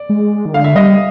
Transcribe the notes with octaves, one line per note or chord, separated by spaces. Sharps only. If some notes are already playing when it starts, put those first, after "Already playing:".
Already playing: D5
G#3
D#3
D3 F5
E5
G3 D#5